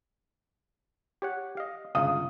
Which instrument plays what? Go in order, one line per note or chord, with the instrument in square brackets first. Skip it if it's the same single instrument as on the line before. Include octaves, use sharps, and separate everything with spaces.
[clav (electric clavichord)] G4 C#5 F#5
D#5 F5
[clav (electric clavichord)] G1 C#2 [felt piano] F5 D#6